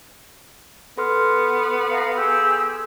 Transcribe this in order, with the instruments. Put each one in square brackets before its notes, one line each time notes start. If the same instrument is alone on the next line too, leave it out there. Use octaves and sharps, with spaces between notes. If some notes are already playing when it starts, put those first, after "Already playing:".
[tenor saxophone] B3 [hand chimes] A4 C6 F6
[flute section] E5 F5 A#5
G4 G#4 E6